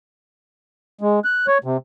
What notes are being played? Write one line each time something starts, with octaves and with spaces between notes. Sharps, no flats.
G#3
F#6
C#5
C3